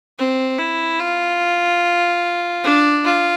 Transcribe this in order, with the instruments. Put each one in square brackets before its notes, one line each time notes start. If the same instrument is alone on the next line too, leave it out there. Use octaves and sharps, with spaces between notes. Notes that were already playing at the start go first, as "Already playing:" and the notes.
[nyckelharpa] C4
E4
F4
D4
F4